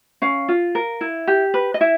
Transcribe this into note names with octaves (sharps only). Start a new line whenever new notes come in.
C#4 F5
F4
A#4
E4
G4
B4
D#5
E4 E5